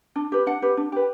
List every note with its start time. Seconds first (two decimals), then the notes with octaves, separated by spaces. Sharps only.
0.16 D4
0.32 G4 B4
0.46 D4 F#5
0.62 G4 B4
0.77 D4
0.92 G4 B4